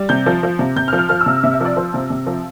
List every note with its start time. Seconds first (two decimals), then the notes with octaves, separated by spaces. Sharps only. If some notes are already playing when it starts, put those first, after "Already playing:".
Already playing: G3
0.09 C3 G6
0.26 F3
0.43 F3
0.59 C3
0.76 C3 G6
0.88 F6
0.93 F3
0.99 F6
1.09 F3 F6
1.21 E6
1.26 C3
1.44 C3 E5
1.54 E5
1.60 F3 D5
1.76 F3 C5
1.94 C3
2.10 C3
2.27 F3